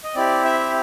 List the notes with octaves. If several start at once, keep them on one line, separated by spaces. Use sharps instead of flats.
D#5
C4 E4 G4 D5
E5